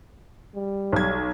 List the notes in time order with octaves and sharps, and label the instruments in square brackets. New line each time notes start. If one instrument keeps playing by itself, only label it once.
[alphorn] G3
[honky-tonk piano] B1 G#6